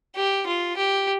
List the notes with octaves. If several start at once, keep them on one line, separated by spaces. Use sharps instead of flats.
G4
F4
G4